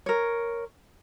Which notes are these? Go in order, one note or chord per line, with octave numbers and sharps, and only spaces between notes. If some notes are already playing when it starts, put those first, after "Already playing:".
A#4 C#5